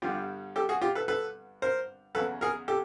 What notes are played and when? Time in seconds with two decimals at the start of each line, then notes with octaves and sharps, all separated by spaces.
0.02 G2 D3 G3 B3 F4 G4
0.56 G4 A4
0.69 F#4 G#4
0.82 F4 G4
0.95 A4 B4
1.08 A4 B4
1.62 A#4 C5
2.15 E2 C#3 F#3 A4 B4
2.41 G#4 A#4
2.68 G4 A4